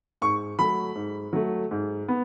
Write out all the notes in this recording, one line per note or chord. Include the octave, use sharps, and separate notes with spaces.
G#2 C#6
F#3 A3 B5
G#2
F#3 A3
G#2
B3